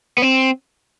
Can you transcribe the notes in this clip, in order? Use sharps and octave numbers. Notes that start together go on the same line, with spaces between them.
B3
C4